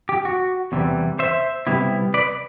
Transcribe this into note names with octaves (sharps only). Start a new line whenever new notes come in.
G4
F#4
E2 C3 E3 G3
C5 E5
C3 G3 B3 E4
B4 D5